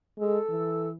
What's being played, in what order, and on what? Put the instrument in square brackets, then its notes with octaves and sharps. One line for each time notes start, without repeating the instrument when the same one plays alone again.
[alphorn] G#3 [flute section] A4 E6
[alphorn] E3